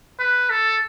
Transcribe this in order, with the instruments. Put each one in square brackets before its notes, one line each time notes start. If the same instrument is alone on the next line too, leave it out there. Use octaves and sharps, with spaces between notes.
[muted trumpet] B4
A4